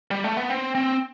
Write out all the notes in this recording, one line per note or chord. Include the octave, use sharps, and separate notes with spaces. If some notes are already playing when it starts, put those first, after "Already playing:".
G3
A3
B3
C4
C4